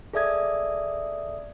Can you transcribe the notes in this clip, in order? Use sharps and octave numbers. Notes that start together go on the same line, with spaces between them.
G#4 A4 D5 E5 D#6 G#6